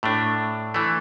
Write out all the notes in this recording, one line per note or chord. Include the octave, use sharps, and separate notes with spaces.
A2 A3 D4
E3 A3